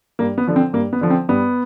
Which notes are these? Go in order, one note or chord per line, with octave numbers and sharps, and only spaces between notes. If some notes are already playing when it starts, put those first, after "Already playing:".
G2 A#3
B3
D3 F3
C4
G2 A#3
B3
D3 F3
C4
G2 B3